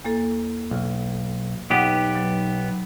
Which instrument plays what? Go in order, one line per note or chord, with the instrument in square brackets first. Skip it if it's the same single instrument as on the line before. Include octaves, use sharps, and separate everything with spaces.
[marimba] E2 A#3 A4
[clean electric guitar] B1
[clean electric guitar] B1 B3 G4 [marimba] D#4 F#5
[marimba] F#3